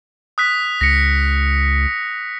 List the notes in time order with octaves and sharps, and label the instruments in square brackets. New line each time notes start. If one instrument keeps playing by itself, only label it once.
[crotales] D#6 F#6 B6
[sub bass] C#2 [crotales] A#6 C#7